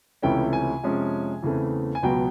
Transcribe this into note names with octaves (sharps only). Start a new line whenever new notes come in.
C#2 C3 E3 A3 C#4 G5
G#5
F2 C3 F3 G#3 C#4
E2 C#3 E3 A3 C4
G#5
C#2 B2 F#3 B3 G5